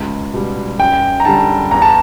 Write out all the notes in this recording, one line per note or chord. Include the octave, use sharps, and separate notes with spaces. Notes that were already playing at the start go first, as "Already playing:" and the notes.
Already playing: C#2
B2 G3
F#2 G5
A#5
D3 G3 A5
E2 A#5
A5